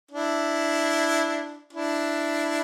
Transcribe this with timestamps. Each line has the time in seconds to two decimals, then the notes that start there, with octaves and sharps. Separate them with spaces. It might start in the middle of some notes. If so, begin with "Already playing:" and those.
0.11 D4 E4
1.73 D4 E4